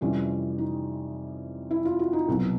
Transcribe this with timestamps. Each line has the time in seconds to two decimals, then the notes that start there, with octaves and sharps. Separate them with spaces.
0.01 F2 C3 E3 G3 C#4
0.58 D#4
1.71 E4
1.85 F4
1.99 F#4
2.13 D#4
2.28 C2 B2 F#3